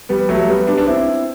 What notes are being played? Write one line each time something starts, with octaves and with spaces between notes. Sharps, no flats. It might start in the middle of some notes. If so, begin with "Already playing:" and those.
G3 B3
F#3 A3
G3 B3
B3 D4
D4
C4 E4